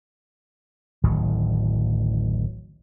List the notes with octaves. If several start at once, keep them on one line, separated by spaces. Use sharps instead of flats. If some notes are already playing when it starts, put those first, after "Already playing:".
D1 A1 D#3 F#3